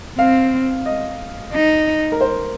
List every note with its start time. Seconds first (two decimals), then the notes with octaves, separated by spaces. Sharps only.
0.18 C4 F5
0.86 D#5
1.53 D#4
2.12 A#4
2.21 C5